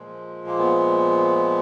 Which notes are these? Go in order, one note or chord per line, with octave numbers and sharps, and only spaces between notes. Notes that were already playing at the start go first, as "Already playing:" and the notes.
Already playing: A#2 F3 G#3
A#3
B3